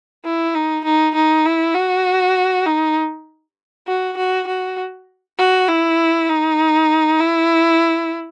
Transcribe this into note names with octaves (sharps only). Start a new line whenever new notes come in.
E4
D#4
D#4
D#4
E4
F#4
D#4
F#4
F#4
F#4
F#4
E4
D#4
E4